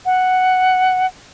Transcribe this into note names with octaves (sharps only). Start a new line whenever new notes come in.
F#5